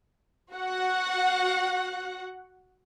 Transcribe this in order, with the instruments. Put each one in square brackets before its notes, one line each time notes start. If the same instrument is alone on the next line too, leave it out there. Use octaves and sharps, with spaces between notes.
[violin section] F#4 F#5